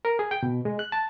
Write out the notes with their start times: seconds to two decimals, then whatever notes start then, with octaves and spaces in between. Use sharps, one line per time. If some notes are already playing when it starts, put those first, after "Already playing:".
0.05 A#4
0.19 G#4
0.31 G5
0.43 B2
0.65 G#3
0.79 F#6
0.92 A5